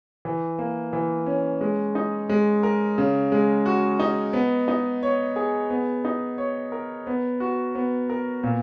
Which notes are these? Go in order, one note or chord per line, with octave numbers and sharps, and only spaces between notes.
E3
A#3
E3
C#4
G#3
D#4
G#3
A#4
C#3
G#3
F#4
D#4
B3
D#4
C#5
G#4
B3
D#4
C#5
A#4
B3
F#4
B3
A#4
A#2